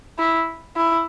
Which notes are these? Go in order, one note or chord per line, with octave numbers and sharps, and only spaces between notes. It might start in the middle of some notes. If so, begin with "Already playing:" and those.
E4
E4